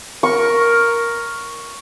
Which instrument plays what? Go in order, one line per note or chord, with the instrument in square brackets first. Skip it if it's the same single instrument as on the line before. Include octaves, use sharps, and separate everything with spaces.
[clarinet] A#4 [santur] C#6